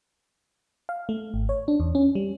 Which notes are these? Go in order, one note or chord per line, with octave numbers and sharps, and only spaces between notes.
F5
A3
G#1
C#5
D4
E2
C#4
G3